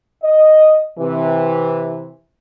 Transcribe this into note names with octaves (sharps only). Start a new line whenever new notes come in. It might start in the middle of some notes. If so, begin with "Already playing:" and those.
D#5
C3 E3